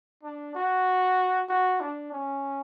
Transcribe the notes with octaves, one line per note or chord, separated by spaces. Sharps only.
D4
F#4
F#4
D4
C#4